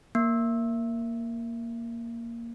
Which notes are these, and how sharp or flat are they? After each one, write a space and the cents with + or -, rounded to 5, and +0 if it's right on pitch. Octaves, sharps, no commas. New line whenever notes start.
A#3 +0